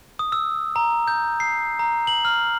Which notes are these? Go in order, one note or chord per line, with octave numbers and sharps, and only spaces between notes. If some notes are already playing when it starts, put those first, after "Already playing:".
D#6
E6
A#5
G6
C7
A#5
F#7
F6